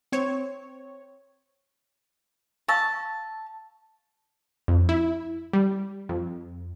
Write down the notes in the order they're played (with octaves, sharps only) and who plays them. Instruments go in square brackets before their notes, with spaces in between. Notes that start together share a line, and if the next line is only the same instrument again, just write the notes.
[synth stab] C4 C#5
[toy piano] F5 C#6 E6 [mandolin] A5
[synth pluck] F2
E4
G3
F2